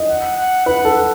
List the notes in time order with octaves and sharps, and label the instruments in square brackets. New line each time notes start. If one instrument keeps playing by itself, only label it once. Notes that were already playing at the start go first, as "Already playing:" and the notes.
Already playing: [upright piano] D#5
[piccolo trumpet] F#5
F#5
[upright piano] B4 [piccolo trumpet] F#5
[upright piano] A4